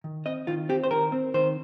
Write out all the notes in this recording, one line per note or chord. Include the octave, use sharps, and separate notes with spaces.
D#3
C4 D#5
D#3 F4
C4 G4
C5
D#3 A#4
C4
D#3 C5